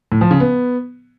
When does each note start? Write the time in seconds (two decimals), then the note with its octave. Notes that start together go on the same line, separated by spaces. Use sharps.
0.12 A2
0.21 F3
0.31 C#3
0.40 B3